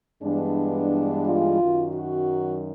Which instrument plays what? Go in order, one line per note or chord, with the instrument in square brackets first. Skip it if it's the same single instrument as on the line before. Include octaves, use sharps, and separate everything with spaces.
[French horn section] G2 E3 G#3 B3 D4
F4
F#2 D#3 F#3
F#4